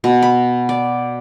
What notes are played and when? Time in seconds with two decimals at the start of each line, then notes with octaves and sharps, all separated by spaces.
0.04 B2
0.22 B5
0.69 D5